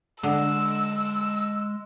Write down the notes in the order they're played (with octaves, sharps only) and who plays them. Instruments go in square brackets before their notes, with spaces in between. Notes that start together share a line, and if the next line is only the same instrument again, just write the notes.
[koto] D3 [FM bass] G#3 [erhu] E6